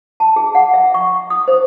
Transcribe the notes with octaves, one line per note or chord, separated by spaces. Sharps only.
A5
G#4
F#5
E5
C#6
D#6
C5